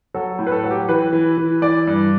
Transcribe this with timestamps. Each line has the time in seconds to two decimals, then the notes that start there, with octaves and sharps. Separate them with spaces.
0.14 F#3 A4
0.39 A2
0.47 B4
0.51 A4
0.64 F#3
0.71 G4
0.89 E3 B4
1.13 E3
1.37 E3
1.62 E3 D5
1.87 G2